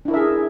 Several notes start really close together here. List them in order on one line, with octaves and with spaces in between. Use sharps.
D4 E4 A#4 E5 G#4